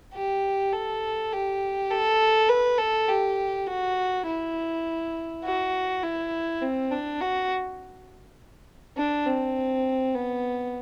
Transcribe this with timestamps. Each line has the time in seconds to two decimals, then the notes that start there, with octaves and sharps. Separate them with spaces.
0.14 G4
0.72 A4
1.32 G4
1.90 A4
2.49 B4
2.78 A4
3.08 G4
3.67 F#4
4.26 E4
5.44 F#4
6.03 E4
6.61 C4
6.91 D4
7.20 F#4
8.97 D4
9.26 C4
10.15 B3